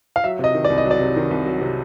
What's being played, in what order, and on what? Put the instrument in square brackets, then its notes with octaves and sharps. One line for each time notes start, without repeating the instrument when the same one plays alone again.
[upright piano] F5
F#3 E5
C3 D#5
D#3
D5
C2
D#5
F#3
D5
C3
D#3
C2
F#3
C3